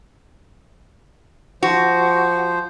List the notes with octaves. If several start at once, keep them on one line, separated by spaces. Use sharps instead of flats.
F3 F#4 C5